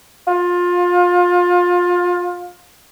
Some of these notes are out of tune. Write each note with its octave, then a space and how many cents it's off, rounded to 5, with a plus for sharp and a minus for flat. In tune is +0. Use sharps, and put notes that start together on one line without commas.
F4 +25